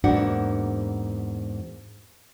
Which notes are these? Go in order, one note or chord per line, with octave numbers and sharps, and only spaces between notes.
E2 G#2 A#3 D4 F#4 F#5